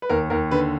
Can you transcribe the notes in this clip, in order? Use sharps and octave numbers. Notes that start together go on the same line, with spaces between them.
B4
D#2 A#4
D#2 A#4
D3 B4